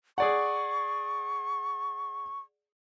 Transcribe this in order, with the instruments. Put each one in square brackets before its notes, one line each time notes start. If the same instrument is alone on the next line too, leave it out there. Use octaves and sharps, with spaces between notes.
[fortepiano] G#4 D5 F#5 [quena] C#6